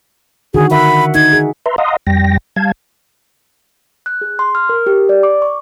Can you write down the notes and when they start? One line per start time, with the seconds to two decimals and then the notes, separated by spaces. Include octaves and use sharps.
0.54 D3 D#3 F#4 G#4
0.71 A#4 E5 F#5 B5
1.15 D#4 G#6
1.33 G#4
1.66 B4 E5 A#5 C6
1.78 D#5 F5 F#5 A#5 C6 D#6
2.07 F2 G3 G5 A#6
2.56 G3 F5 A5 G#6
4.06 F#6
4.21 G#4
4.39 C6
4.55 F6
4.69 A#4
4.87 G4
5.09 D5
5.23 D6
5.42 C#6